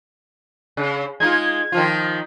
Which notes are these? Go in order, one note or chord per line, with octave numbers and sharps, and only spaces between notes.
C#3
G#3 D#4 F4 G#6
D#3 F3 F4